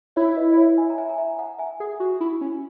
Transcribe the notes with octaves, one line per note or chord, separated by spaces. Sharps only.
E4 C#5 E5
B4 D#5
C#5 E5
E5 G#5
A#5
E5 G#5
A#5
E5 G#5
F#5 A#5
E5 G#5
G#4
F#4
E4
C#4